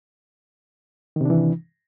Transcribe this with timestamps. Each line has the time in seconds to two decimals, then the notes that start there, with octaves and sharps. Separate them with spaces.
1.16 D#3
1.21 C3
1.25 D4
1.30 E3